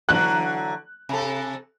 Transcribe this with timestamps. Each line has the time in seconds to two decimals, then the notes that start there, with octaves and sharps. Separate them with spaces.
0.09 D3 E3 F#3 F#6
1.09 C3 A4